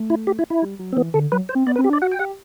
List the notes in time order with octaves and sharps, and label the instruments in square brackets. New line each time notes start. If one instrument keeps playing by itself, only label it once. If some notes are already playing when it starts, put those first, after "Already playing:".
Already playing: [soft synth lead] A3
[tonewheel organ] E4
G4
E4
E4
[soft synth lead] G3
F#3
[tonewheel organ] C4
[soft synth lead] E3 [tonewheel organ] B3
[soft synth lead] D3 [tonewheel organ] A4
[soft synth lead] F#3 [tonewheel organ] B4
[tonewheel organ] C5
[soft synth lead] C4
[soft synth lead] B3 [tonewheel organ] D5
[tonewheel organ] B4
[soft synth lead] C4
[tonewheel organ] G4
[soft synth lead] D4
[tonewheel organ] D5
[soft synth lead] F#4 [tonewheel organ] F#5
[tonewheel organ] G5
[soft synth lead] G4 [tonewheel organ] F#5